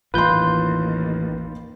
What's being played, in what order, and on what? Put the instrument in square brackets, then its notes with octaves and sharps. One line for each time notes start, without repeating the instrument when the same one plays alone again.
[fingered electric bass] A1 E3 [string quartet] D#2 [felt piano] F4 C6 [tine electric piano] B4 G6